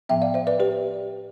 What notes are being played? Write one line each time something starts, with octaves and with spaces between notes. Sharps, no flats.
A2 F3 B3 E5 G5
D5 F5
C5 E5
B4 D5
G4 B4